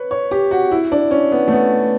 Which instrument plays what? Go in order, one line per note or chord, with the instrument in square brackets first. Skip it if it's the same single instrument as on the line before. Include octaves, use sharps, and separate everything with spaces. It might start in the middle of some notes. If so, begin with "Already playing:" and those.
Already playing: [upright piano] B4 C#5
C#5
G4
F#4
E4
D4
C#4
B3
A3
B3